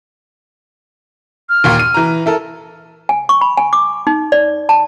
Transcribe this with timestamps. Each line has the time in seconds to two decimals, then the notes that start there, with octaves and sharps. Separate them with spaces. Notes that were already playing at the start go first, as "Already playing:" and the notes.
1.49 F6
1.64 D#2 A#2
1.79 D#7
1.94 E3 A#5
2.26 E4 A4 A#4
3.09 G#5
3.29 C#6
3.41 B5
3.57 G#5
3.73 D6
4.07 D#4
4.32 D5
4.69 A5